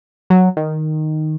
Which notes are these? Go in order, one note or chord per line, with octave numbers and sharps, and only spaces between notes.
F#3
D#3